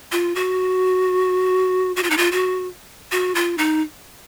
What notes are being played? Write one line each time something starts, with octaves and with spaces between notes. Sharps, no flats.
F4
F#4
F#4
F4
D#4
F4
F#4
F#4
F4
D#4